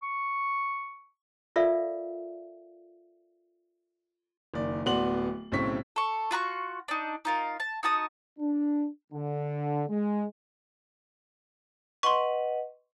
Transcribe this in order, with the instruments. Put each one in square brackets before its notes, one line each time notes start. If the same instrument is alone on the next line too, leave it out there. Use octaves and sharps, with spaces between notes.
[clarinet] C#6
[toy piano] F4 A4 A#4 D5 E5 F5
[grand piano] F#1 D#3 D5
D1 B3 F#4 D5 C6 F#7
B1 A2 C#3 C4 C#6 B6
[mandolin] A4 C#6
F4 F#4 B5 C#6
D4 D#4
D#4 F4 A#4
A5
D#4 F#4 A5 D#6
[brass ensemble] D4
D3
G#3
[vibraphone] B4 D#5 F#5 [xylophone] C6 C#6